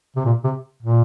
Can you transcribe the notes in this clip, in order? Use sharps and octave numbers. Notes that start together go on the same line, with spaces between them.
C3
A#2
C3
A#2